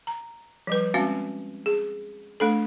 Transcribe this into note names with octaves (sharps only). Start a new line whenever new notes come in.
A#5
F3 G3 B4
G#3 C4 C#4 F#4 F5
G#4
A3 D4 A4